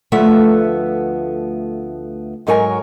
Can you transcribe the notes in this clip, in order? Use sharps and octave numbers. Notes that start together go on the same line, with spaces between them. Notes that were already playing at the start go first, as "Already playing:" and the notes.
D2 F3 A3 B3 E5 F#5
G#2 F#3 A#4 C#5 G#5